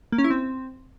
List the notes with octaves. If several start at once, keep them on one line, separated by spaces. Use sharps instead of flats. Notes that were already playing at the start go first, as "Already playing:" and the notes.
A#3
C#4
E4
C4